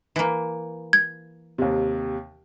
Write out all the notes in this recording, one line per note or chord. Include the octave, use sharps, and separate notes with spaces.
E3 A#3
G#6
D#2 C3